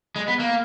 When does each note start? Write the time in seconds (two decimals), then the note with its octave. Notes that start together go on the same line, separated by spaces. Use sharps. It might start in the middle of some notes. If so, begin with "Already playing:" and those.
0.16 G#3
0.28 B3
0.40 A#3